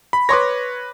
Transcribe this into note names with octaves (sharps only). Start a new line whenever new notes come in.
B5
B4 C#5 C6 D6 A#6